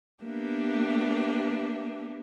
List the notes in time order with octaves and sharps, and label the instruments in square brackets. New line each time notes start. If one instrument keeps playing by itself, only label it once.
[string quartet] A#3 B3 D4 G4 E5